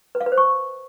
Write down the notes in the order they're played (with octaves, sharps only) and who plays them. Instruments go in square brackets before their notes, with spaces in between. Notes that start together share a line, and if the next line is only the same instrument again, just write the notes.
[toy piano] B4
F5
B4
C5
C#6